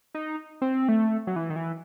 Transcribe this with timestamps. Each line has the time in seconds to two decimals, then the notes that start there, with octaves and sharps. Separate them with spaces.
0.15 D#4
0.62 C4
0.88 A3
1.27 F#3
1.36 E3
1.50 D#3
1.56 E3